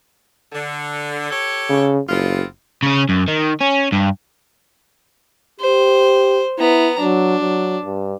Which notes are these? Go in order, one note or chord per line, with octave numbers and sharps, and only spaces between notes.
D3
G4 A4 C#5
C#3
F#1 B3 C4 F4
C#3 C#4
F#2
D#3
C#4
G2
G4 C5
B3 E4 A#5
F#3 D4
F#3
G2